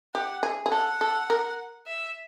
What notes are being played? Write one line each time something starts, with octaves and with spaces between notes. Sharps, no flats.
G4 F#5
G#4
G#4
A4 F#5
A4
A#4
E5